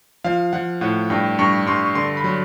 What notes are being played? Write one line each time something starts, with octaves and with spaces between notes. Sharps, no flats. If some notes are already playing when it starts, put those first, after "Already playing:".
F3 F5
F3 F#5
A2 F#5
G2 G5
G2 C#6
G2 C6
D3 C6
B5
F#3